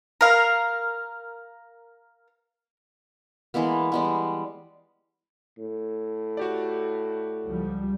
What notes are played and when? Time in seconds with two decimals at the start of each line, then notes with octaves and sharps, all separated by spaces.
0.21 A#4 F5
3.54 E3 G#3 A#3 B3
3.92 G3 G#3 B3
5.58 A2
6.37 F#4 G4 D5
7.46 C#2 F3 G3